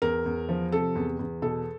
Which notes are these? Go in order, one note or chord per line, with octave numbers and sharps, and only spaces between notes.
E2 A#4
E2
F3
C3 A4
E2
E2
B2 A4